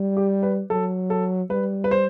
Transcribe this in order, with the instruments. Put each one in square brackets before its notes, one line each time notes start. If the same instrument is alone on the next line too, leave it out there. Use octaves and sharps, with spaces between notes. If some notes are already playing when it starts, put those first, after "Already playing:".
Already playing: [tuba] G3
[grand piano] G4
B4
[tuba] F#3 [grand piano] A4
[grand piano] A4
[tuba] G3 [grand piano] B4
[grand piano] B4
C5